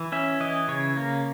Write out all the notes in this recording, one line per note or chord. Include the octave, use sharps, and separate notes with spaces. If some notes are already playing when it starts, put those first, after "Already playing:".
Already playing: E3
C#4 E5
E3 D#5
C#3 C#5
A#3